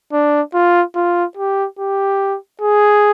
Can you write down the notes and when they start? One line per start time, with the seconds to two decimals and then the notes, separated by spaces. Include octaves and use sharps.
0.12 D4
0.54 F4
0.95 F4
1.37 G4
1.79 G4
2.61 G#4